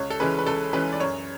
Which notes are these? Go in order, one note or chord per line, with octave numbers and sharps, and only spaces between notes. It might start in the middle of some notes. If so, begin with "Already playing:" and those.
Already playing: C#2 C#5
A4
C#3 E3 G#3 C#4 B4
B4
C#2 A4
C#3 E3 G#3 C#4 B4
D5
F#2 C#5